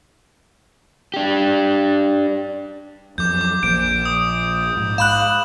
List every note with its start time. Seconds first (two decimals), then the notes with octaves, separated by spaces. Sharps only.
1.14 D4 G4
3.18 F2 F#3 D6 G6
3.41 D6
3.63 A#1 A#2 F3 G6 D7
4.06 D#6
4.77 G#2
4.98 F5 B5 F#6 E7 F#7